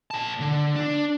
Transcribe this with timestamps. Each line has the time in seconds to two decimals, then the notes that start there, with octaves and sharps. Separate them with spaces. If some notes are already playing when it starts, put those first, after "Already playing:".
0.11 A#2 A5
0.40 D3
0.76 D4